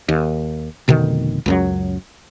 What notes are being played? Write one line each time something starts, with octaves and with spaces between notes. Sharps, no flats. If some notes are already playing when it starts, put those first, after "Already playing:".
D#2
F1 B2 D3 D#3
C#2 F#2 F#3